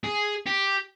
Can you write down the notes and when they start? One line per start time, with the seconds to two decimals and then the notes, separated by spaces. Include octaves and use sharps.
0.04 G#4
0.47 G4